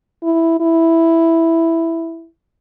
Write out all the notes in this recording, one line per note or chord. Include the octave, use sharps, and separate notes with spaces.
E4
E4